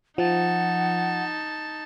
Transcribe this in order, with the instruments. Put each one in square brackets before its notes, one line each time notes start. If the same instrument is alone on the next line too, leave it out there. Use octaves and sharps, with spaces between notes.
[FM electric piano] F3 [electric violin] D#4 A5 [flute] F#5